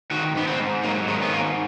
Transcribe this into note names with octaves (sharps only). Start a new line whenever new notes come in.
D#3 F#4
G#2 B3
C4
G#2
F#3 A#3
D#3 G#3
B3
G#2 A#3